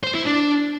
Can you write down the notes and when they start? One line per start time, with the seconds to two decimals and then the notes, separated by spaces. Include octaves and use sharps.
0.04 C5
0.15 E4
0.26 D4